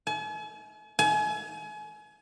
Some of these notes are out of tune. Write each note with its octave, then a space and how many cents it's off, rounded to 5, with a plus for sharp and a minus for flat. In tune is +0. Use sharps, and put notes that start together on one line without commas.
G#5 +45
G#5 +35